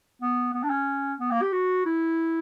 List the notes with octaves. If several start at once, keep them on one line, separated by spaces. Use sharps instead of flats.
B3
B3
D4
C#4
B3
A#3
G4
F#4
E4